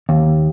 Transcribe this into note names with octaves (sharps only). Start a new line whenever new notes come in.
D#2